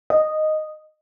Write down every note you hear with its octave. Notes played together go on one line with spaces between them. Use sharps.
D#5